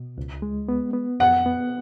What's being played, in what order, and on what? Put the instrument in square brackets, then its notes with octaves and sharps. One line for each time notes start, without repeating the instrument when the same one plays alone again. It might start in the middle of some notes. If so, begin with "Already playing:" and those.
Already playing: [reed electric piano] B2
C#2
G#3
B3
B3
[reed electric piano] F2 [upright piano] F#5
[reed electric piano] B3